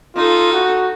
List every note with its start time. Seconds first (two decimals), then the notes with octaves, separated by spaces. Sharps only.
0.16 D#4 F4 A4
0.53 F#4